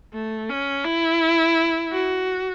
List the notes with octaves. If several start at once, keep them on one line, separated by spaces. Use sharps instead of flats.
A3
C#4
E4
F#4